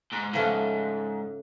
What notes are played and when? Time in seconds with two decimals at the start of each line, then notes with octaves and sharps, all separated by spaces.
0.13 G#2
0.34 G#2 C#3 F3 A3 F4